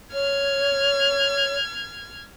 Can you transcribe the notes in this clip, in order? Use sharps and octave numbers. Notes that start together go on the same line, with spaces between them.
C#5 F6 G#6